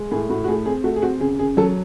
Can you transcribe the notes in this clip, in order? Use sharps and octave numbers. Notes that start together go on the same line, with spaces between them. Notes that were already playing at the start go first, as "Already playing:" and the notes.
Already playing: G#3
A2 G#4
A2 F#4
F#4
A3 G#4
C4 G#4
A3 F#4
G#4
C4 F#4
C#3 G#4
C#3 G#4
F#3 A4